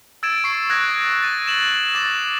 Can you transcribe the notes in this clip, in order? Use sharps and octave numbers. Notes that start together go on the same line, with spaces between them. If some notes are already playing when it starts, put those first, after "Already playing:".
E6 G#6 A6 D7 E7
C#6 C7
D#6 F#6 G#6 A#6
A6 D#7
E7 F#7
D6 A6 E7